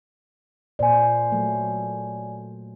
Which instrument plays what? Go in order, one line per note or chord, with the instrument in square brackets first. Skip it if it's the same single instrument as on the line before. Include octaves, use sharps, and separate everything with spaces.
[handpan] A#2 C5 [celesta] D5 G#5
[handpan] F#3 A3